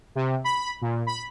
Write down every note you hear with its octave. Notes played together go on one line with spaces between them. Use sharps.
C3
B5
A#2
B5